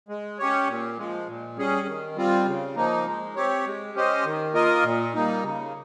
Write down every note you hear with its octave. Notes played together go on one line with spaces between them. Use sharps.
G#3
C#4 G4 C#5
A#2
F3 G#3
A#2
G3 C#4 G#4
D#3
G3 C4 F4
C#3
F3 A#3 D#4
G#3
C4 G4 C#5
G#3
C#4 G4 C5 D#5
D#3
A#3 F4 A#4 D#5
A#2
G3 A#3 D#4
C#3